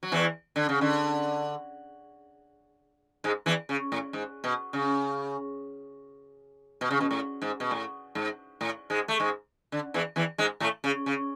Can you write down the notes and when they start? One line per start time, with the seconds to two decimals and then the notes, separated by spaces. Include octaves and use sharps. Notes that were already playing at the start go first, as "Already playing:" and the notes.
0.03 F#3
0.12 E2 E3
0.56 D3
0.69 C#3
0.81 D3
3.24 G#2 G#3
3.46 E2 E3
3.69 C#3
3.92 A2
4.13 G#2
4.44 B2
4.73 C#3
6.81 B2
6.91 C#3
7.01 B2
7.11 A2
7.42 G#2
7.60 B2
7.71 A2
8.15 G#2
8.61 A2
8.90 G#2 G#3
9.08 A3
9.20 G#2 G#3
9.72 D3
9.94 E2 E3
10.16 E2 E3
10.38 G#2 G#3
10.60 A2 A3
10.84 C#3
11.06 C#3